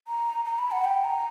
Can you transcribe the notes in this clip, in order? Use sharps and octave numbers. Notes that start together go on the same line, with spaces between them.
A#5
A#5
B5
F#5
G5
A#5